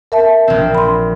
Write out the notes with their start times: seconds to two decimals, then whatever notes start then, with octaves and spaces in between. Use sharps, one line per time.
0.12 A#4 E5 A5
0.48 A#1 C4
0.75 B5 C6